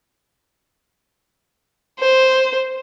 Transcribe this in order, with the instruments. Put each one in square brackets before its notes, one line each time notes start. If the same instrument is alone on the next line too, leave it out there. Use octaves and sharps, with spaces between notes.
[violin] C5